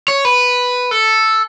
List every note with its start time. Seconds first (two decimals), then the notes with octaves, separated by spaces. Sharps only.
0.08 C#5
0.25 B4
0.91 A4